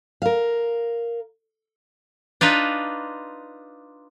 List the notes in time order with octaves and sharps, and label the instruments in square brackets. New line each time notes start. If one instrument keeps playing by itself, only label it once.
[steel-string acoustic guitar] A#4 F5
[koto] D4 D#4 F4 B4